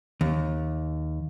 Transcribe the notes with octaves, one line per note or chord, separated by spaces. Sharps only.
D#2